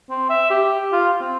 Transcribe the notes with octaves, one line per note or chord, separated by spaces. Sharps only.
C4
E5
G4
F4
C4